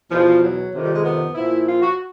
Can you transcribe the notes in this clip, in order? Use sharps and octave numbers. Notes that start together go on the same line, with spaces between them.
E2 B2 F3
F#3
F2 C3 D#3
G3
G#3
B3
A#2 F3 E4
F4
F#4